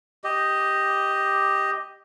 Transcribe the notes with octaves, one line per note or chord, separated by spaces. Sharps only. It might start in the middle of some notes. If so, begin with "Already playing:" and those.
G4 D#5